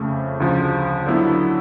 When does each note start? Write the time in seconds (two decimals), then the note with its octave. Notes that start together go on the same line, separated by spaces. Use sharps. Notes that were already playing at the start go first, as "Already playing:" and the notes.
Already playing: F2 C#3 F3 A3
0.40 D2 C#3 F3
1.06 D3 F#3 B3 E4